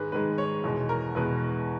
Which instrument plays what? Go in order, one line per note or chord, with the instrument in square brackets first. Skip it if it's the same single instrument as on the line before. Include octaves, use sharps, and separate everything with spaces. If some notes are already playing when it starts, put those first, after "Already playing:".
Already playing: [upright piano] G#2 D#3 G#3 G#4 B4
G#2 D#3 G#3 B4
C#5
E2 B2 G#3
A#4
E2 B2 G#3 B4